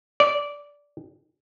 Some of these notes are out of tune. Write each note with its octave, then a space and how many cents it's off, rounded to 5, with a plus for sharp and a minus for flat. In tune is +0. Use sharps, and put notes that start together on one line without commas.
D5 -15